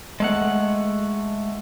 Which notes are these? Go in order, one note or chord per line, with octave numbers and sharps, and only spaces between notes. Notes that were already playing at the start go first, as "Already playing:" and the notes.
G#3 A3 F#5